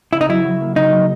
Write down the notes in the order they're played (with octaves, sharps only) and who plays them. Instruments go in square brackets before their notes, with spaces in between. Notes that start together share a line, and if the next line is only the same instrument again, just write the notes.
[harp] C#3 [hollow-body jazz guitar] E4
[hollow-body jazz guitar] D#4
[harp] F#3 [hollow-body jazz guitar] E4
[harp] F#3
A#3
[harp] C#3 [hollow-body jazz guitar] D#4
[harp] F#3